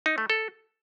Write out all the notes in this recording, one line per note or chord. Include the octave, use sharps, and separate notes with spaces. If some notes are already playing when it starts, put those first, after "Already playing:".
D#4
A3
A4